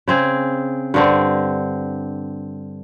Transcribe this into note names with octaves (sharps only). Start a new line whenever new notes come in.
C#3 C4 G#4
G2 D3 C4